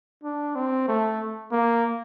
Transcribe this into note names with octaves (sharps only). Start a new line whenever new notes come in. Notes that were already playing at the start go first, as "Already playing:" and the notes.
D4
C4
A3
A#3